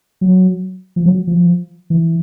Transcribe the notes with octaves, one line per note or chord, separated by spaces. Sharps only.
F#3
F3
F#3
F3
E3